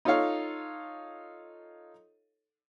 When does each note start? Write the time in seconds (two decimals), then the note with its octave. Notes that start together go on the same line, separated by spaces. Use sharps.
0.05 D#4 F4 A4 C#5 F5